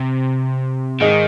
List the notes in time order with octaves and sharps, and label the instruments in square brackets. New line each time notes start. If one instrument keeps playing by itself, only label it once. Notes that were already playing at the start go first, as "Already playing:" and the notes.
Already playing: [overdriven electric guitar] C3
[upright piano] G#2 G#3 D#4 [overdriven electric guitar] D#3